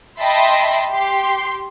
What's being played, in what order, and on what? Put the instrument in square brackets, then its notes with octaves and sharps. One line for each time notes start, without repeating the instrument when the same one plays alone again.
[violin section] D#5 E5 G5 A5 B5 C6
G4 C6